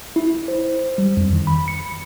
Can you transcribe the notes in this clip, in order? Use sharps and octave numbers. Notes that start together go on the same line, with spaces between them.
E4
C5
G3
F2
D#3
B5
C#7